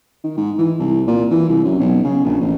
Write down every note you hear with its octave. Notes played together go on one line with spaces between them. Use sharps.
D#3
G#2
E3
C2
A#2
E3
C2
F#2
B1
C#3
A#1
A1